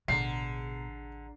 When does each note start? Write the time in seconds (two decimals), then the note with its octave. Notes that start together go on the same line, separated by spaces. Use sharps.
0.08 A1 B2 D3 G#4 A#5 C7